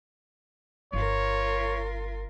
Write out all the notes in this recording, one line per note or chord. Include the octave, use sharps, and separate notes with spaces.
G1 F4 A#4 C#5